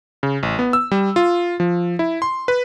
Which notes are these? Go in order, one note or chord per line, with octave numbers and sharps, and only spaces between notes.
C#3
A1
B3
E6
G3
F4
F3
E4
C6
B4